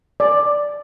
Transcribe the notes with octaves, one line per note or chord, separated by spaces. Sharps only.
D5